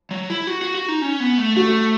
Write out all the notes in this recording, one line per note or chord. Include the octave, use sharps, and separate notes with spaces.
F#3
E4
F#4
F#4
F#4
D#4
C#4
B3
A3
A3 F#4